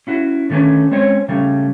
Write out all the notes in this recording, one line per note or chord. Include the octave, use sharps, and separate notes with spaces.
C#4 E4 F#4
D3 D#3 A3 B3 C#4 B4
G#3 C4 C#4 C5 C#5
C#3 G3 A3 C#4